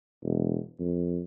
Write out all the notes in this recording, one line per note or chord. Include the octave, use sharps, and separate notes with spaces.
E1
F2